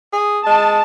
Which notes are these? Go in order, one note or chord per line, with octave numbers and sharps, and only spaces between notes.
G#4
G#3 A5